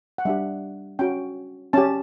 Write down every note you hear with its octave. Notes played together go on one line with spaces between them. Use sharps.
F#5
G3 D4 G4 E5
C#4 F#4 G5
C#4 G4 A5